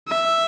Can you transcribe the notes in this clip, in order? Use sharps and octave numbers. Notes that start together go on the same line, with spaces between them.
E5